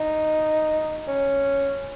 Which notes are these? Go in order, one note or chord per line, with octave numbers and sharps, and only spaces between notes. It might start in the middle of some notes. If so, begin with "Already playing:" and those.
Already playing: D#4
C#4